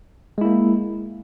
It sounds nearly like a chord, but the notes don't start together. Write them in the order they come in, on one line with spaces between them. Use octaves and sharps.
G#3 E4 A#3